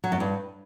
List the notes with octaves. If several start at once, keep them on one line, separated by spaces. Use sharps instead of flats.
F#3
F#2
G2